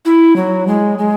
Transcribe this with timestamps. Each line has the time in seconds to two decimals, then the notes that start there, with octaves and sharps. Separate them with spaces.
0.05 E4
0.36 F#3
0.67 G#3
0.98 G#3